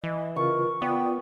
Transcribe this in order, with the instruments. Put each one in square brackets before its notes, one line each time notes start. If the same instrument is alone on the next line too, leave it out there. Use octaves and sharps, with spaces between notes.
[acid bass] E3 [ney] D#5
[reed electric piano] C#3 F4 [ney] A#4 [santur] C#6
[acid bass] B3 [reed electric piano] F4 D5 D#6 [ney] G5